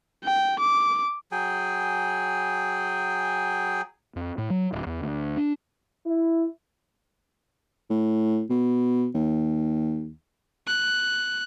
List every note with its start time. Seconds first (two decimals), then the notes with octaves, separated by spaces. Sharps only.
0.24 G5
0.60 D6
1.32 F#3 G#4 G5 G#5
4.16 F2
4.38 A2
4.50 F#3
4.73 D1
4.86 E2
5.01 D2
5.37 D4
6.06 E4
7.90 A2
8.50 B2
9.14 D#2
10.67 F#6